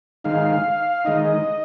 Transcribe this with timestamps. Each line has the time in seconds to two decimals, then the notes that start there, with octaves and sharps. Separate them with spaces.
0.24 D#3 G#3 D#4 F5
1.05 D#3 G#3 D#4 D#5